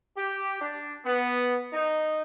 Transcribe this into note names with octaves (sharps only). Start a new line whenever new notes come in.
G4
D4
B3
D#4